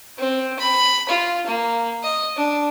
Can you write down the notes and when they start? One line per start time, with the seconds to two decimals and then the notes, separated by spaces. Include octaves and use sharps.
0.18 C4
0.59 B5
1.09 F4
1.46 A#3
2.03 D#5
2.37 D4